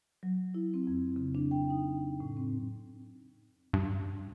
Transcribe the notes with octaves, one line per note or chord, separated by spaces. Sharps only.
F#3
E4
C4
F2
C#3
D4
G5
D#4
A2
C4
G2